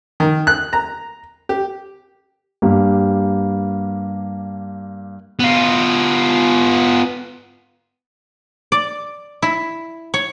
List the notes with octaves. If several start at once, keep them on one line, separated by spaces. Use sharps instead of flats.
D#3
F#6
A#5
G4
G2 A#3 G4
B3 F4
D5
E4
C#5